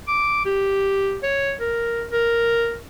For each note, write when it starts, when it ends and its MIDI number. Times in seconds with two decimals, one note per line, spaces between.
0.08 0.44 86
0.45 1.18 67
1.23 1.53 73
1.61 2.04 70
2.12 2.76 70